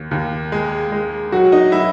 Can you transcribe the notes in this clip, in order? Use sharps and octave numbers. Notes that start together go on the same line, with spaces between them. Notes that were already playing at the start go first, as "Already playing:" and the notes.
Already playing: D#2
D#2
G#3
G#3
F#3 F#4
D#4
F#3 E4